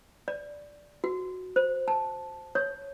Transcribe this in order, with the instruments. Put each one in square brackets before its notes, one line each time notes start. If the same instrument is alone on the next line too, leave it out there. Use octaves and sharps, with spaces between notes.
[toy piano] D5
F#4
C5
A5
C#5